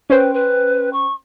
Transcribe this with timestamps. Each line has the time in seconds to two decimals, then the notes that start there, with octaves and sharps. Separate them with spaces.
0.10 C#4 B4 C5 G5
0.33 B4
0.93 C#6